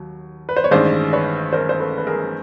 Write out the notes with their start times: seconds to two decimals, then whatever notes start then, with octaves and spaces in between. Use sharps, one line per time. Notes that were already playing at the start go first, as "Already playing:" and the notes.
Already playing: D#2 F#3
0.49 B4
0.56 C5
0.64 C#5
0.71 A1 G2 D#3 G#3 C5 D5
1.13 B4 C#5
1.53 A#4 C5
1.69 C5
1.80 A4 B4
1.98 B4
2.07 G#4 A#4